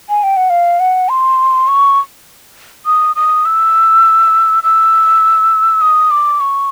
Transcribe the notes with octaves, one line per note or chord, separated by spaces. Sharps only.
G#5
G5
F#5
F5
F#5
C6
C#6
D#6
D#6
E6
E6
D#6
D6
C#6